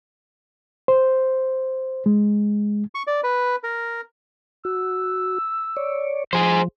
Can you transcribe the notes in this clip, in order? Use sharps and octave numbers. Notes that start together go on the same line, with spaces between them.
C5
G#3
C#6
D5
B4
A#4
F#4 E6
C#5 D5
F3 G#4 C5